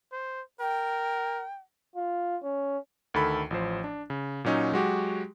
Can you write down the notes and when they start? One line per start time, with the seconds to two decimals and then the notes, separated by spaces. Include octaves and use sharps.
0.12 C5
0.60 A#4 G5
1.96 F4
2.43 C#4
3.14 D2 D#3 A4 B5
3.50 A1 F3 C5
3.84 D4
4.10 C#3
4.45 A#2 F#3 C#4 D#4
4.72 F#3 G#3 F#4 G4